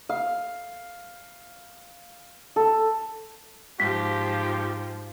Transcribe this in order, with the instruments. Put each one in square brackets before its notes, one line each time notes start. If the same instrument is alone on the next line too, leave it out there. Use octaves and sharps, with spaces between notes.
[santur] F5
A4
[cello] G#2 [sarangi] F3 [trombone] G4 [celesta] B6